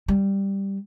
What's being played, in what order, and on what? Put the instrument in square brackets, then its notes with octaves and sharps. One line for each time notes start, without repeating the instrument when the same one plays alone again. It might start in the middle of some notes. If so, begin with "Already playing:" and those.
[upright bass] G3